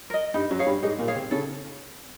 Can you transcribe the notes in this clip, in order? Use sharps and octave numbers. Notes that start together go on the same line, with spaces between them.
A#4 D#5
G2 G3 D#4
F#2 F#3
G#4 C#5 F5
G2 G3
G#2 G#3 D#4
A#2 A#3
G#4 C#5 F5
C3 C4
C#3 C#4 A4